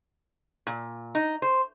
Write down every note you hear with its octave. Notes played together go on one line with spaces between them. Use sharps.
A#2
D#4
C5